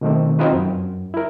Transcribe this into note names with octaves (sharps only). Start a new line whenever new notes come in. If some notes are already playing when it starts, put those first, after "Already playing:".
B2 D#3 A3 C4
C4 D#4 F4 F#4 B4 C5
F#2
E4 A#4